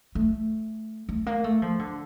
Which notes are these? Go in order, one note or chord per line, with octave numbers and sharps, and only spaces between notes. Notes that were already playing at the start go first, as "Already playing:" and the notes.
A3
A3
A#3
A3
F3
D3